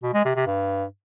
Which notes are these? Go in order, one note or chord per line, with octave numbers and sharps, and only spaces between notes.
B2
G#3
C3
C3
G2